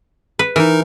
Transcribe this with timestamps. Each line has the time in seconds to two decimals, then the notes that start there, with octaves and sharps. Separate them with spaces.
0.39 B4
0.56 E3 D#4 A#4